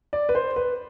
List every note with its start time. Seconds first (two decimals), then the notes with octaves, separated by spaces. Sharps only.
0.13 D5
0.29 B4
0.35 C5
0.56 B4